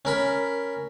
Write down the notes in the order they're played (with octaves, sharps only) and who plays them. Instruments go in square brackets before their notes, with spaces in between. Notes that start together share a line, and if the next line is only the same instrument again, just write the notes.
[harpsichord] C#4 A#4 B5